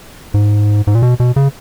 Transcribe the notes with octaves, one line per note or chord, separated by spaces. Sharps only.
G#2
G#2
A#2
B2
B2
C#3